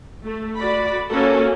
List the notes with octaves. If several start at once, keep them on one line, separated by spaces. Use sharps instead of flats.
A3
F#4 D5 B5
A#3 C#4 F#4 A4